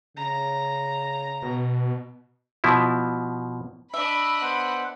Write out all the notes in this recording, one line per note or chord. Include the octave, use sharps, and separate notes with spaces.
C#3 A#5
B2
B2 F3 E4
D4 D#5 E5 B5
B3 C5 F#5